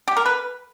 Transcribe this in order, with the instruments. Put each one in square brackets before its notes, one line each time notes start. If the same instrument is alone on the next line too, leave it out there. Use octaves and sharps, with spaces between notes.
[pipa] G4
A#4
B4